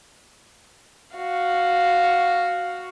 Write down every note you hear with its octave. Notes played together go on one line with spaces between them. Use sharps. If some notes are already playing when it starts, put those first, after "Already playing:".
F#4 F5